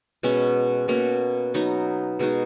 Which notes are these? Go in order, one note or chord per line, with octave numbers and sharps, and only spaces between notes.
B2 G#3 C#4
B2 A#3 C#4 F#4
F#3 B3 D#4
B2 G#3 D#4 F#4